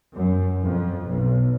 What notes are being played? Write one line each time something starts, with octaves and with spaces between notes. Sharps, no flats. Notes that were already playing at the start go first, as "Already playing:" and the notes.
F#2
F2
B1